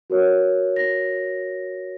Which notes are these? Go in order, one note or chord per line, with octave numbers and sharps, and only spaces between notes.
F#4 A#4 C#5
A#6